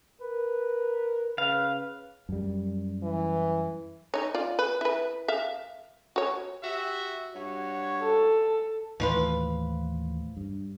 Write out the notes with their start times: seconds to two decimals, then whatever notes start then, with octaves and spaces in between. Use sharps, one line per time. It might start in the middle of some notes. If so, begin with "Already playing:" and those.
0.21 A#4 B4
1.38 C#3 B4 F5
2.29 F#2 G3
3.03 E3
4.14 D#4 C#5
4.35 F4 D5
4.59 B4
4.81 E4 B4
5.28 E5 F5
6.16 F#4 C#5
6.63 F#4 G4 E5
7.35 G2 F#4 C#5
8.02 A4
9.00 D#2 A2 E3 F3 F4 B4
10.37 G2